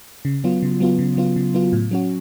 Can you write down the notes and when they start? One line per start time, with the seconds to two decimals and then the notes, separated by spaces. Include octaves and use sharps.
0.25 C#3
0.44 F#3 B3 F4
0.62 C#3
0.80 F#3 B3 F4
0.99 C#3
1.17 F#3 B3 F4
1.36 C#3
1.54 F#3 B3 F4
1.73 A2
1.91 F#3 C#4 F#4